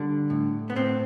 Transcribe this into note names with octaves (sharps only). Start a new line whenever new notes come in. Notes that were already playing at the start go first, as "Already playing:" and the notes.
Already playing: D3 G3 D4
A2
B3
A2 C4